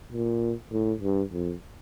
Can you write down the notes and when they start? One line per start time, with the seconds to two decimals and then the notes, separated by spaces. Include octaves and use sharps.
0.12 A#2
0.72 A2
1.01 G2
1.32 F2